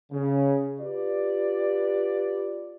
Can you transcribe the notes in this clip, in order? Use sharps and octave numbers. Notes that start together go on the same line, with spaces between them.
C#3
F4 G4 B4 D5